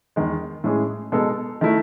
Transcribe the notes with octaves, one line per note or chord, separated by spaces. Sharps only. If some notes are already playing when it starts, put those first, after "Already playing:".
E2 D#3 G#3
A2 G#3 C#4 G#4
B2 G#3 D#4 A4
D#3 A3 E4